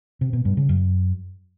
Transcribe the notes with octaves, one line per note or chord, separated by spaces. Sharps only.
C3
B2
G2
C#3
F#2